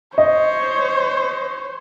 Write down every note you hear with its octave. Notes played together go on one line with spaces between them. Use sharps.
C5 C#5 D#5